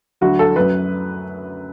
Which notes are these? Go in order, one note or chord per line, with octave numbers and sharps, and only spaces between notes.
D2 D3 F#3 F#4
A4
F#2 F#3 B4